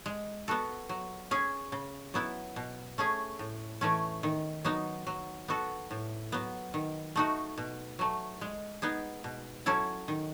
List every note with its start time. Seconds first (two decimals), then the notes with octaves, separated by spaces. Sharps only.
0.06 G#3
0.48 B3 F#4 A4
0.89 F#3
1.31 C#4 G#4
1.72 C#3
2.14 F#3 B3 E4
2.56 B2
2.98 A3 C#4 G#4
3.39 A2
3.81 E3 A3 C#4
4.23 D#3
4.65 F#3 B3 D#4
5.07 F#3
5.48 B3 F#4 A4
5.91 A2
6.32 F#3 B3
6.74 D#3
7.16 A3 D#4 F#4
7.57 B2
7.99 F#3 A3
8.41 G#3
8.82 B3 D#4 G#4
9.24 B2
9.66 F#3 C#4 E4 A4
10.08 D#3